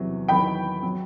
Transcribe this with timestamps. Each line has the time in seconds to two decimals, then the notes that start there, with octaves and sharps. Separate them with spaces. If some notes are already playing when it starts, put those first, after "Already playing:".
Already playing: E2 C3 F#3
0.28 E2 D#3 F#3 G5 B5
0.83 F#3